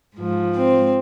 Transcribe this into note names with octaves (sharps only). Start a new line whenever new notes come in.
G#2 F3
C4